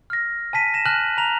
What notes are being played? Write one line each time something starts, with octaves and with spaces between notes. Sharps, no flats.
F6 A#6
G#5 A5 B6 D#7
A#6 E7
G#5 A5 F6 F#6 A#6 F#7
A#5 F7